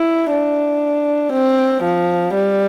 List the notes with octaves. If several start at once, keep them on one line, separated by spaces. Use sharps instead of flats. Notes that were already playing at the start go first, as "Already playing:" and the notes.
Already playing: E4
D4
C4
F3
G3